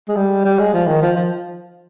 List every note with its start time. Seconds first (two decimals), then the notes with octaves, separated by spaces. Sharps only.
0.08 G#3
0.16 G3
0.45 G3
0.59 G#3
0.73 F3
0.87 D#3
1.02 F3
1.16 F3